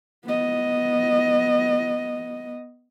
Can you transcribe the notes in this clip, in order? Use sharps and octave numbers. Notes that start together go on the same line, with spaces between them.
B3 D#5